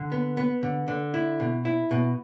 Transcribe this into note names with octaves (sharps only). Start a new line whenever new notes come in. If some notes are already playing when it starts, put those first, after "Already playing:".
Already playing: D3
B3
B3
D3
D3
E4
B2
E4
B2